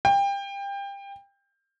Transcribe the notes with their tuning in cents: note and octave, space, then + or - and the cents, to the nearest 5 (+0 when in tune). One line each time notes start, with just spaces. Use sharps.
G5 +25